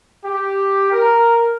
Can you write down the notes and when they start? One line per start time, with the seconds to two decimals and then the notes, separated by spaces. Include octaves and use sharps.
0.24 G4
0.92 A#4